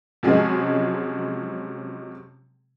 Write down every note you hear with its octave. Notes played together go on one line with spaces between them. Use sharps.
C3 F3 F#3 G#3 C#4 G#4